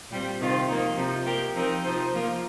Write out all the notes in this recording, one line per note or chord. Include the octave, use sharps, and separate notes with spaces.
A#2 G3 C4
C3 D#3 C4 F4
F3 A#3 D#4
C3 F3 D#4
A#3 G4 A#4
F3 C4 D#4 A#4
C3 F3 D#4 C5
F3 A#3 F4 A#4